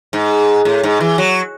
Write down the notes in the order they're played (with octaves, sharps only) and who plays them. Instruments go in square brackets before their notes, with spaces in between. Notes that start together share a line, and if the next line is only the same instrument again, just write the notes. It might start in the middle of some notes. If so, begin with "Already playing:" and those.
[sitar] G#2
A2
G#2
E3
F#3